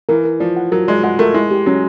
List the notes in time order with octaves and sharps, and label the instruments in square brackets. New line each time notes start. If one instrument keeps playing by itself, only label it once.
[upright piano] E3 [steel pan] A#4
[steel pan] A#4
[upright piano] F3 [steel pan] D5
[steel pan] F#5
[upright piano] F#3 [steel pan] A#4
[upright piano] G#3 [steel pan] D5
[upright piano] G#3 [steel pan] F#5
[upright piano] A3 [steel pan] A#4
[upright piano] G#3 [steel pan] E4
[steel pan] G4
[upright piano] F#3 [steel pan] C#4